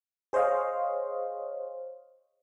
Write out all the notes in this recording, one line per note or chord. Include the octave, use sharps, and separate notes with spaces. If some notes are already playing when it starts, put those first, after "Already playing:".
G#4 C5 C#5 D#5 F5